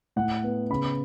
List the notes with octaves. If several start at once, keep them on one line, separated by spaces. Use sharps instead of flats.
A2 F#5
B3
C#3 B5